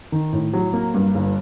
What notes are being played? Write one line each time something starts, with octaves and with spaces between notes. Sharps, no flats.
D#3
A2
F#3
A#3
G2
G1